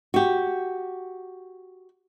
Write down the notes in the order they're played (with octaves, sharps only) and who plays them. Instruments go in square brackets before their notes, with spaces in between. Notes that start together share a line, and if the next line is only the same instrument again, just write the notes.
[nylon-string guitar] F#4 G4